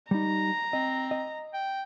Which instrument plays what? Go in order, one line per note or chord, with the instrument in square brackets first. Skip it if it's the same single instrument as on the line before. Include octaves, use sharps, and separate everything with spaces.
[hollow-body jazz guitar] G3 D#4 [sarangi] A#5
[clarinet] C4 [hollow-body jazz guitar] D#5
[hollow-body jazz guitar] D#5
[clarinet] G5